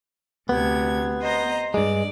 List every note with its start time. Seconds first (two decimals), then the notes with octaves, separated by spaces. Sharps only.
0.49 D2 C3 B3 G#6
1.22 C5 D#5 A#5
1.74 G2 G#3 D5